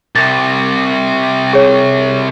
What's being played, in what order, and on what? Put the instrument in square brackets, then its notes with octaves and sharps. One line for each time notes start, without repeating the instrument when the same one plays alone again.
[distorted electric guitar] C2 C3 [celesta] A6
[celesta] G#4 C#5